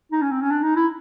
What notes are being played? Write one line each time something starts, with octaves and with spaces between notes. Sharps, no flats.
D#4
C#4
C4
C#4
D4
D#4
E4